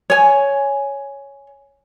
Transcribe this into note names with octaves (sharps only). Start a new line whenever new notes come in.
C#5 G#5